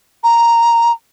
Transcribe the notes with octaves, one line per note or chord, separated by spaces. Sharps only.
A#5